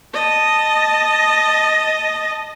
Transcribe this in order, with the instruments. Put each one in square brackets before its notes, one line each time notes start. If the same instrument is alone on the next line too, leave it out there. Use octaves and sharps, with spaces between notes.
[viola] D#5 A5